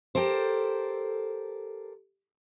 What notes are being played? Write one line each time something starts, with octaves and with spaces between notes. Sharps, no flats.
G4 A4 A#4 C5